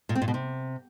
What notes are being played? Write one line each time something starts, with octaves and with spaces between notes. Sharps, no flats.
A#2
C4
A#2
B2
C3